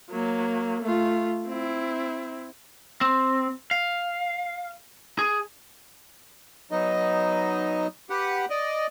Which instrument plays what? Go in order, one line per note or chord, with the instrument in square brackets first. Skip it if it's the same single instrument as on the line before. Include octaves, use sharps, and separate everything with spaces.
[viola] F#3 A#3
A3 F4
C4 E4
[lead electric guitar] C4
F5
G#4
[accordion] F#3 B3 D#4 D#5
G4 B4 F#5
D5 D#5